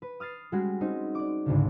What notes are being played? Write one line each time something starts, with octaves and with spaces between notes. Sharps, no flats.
B4
D#6 F6 A6 C7
G3 G#3 C#4 F#4 G#4
C4 C#4 D#4
D5 D6
G#1 D2 C#3